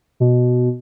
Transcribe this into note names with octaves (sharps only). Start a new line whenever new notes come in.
B2